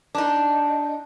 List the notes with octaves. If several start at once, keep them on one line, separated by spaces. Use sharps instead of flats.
D4 D#4